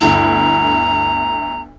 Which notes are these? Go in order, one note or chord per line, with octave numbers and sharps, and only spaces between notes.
G1 D2 E4 A#5